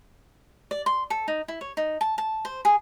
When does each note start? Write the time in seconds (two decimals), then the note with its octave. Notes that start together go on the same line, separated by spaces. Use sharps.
0.71 D5
0.86 C6
1.10 A4
1.28 D#4
1.48 E4
1.61 C#5
1.77 D#4
2.01 A5
2.18 A5
2.45 C5
2.65 G#4